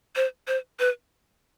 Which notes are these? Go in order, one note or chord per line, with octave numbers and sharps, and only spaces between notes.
C5
C5
B4